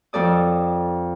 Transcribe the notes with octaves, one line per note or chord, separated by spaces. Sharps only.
F2 A4 D5 D#6